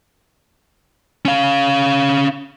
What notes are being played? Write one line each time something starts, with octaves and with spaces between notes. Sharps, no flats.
C#4 F5